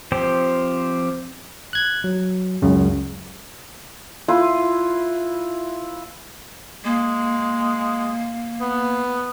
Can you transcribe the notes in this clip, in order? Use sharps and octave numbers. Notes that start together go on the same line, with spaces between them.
F3 C4 G4 C5
F#6 G#6
F#3
C#2 F#2 C#3
E4 F4 B4 C6
G#3 A#3
B3